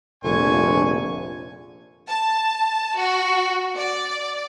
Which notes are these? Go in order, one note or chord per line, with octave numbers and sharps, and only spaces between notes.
F1 A#1 D3 G#5 C#6
A5
F#4
D5